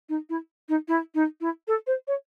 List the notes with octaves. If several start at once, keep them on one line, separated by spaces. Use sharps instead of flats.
D#4
E4
D#4
E4
D#4
E4
A4
C5
C#5